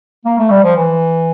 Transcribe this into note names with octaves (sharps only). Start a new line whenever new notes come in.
A#3
A3
G3
F3
E3